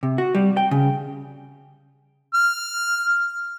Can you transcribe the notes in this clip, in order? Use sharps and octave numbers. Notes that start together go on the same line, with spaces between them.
C3
F#4
G3
G5
C#3
F6